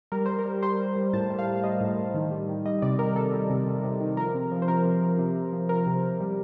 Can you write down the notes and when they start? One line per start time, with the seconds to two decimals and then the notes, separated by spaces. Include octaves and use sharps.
0.12 G3 A#4
0.26 G3 C5
0.39 A#4
0.46 G3
0.62 G3 C5
0.79 G3
0.96 G3
1.13 A2 A5
1.30 G3
1.39 F5
1.47 G3
1.56 F5
1.64 G3 D#5
1.81 A2
1.98 A2
2.15 D#3
2.31 G3
2.48 D#3
2.65 G3 D#5
2.82 C3 D5
2.99 G3 A#4
3.16 C3 A4
3.33 G3
3.50 C3
3.67 C3
3.83 C3
4.01 D#3
4.17 F3 A#4
4.34 C3
4.52 F3
4.62 C5
4.68 C3 A#4
4.85 C3
5.02 F3
5.19 C3
5.36 C3
5.53 F3
5.69 F3 A#4
5.86 C3
6.03 C3
6.20 G3